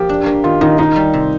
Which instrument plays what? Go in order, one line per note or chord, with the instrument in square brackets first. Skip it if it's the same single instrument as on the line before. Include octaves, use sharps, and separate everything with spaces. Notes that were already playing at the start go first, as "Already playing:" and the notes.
Already playing: [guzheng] F3 A#3 [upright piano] G4
[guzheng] D4
A#3
[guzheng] D#3 [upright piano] F4
[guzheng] D#3 [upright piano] D#4
[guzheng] A#3 [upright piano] D#4
[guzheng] G3
C3